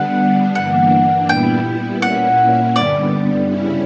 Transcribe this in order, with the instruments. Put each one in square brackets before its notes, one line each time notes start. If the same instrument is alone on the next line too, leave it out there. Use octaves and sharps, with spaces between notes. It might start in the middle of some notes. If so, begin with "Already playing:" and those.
Already playing: [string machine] D3 G3 B3 D4 [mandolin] F#5
[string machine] G2 E3 A#3 D4 [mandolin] F#5
[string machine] A#2 G3 B3 E4 [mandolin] G5
[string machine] A#2 A#3 C#4 E4 [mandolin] F#5
[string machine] G2 D3 G3 B3 [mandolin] D5
[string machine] C#3 G3 C#4 E4